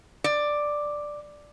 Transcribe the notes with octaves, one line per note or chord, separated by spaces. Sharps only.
D5